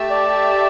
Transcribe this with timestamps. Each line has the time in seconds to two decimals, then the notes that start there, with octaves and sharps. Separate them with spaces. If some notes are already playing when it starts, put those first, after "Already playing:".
Already playing: A3 G4 E5 A5
0.11 D5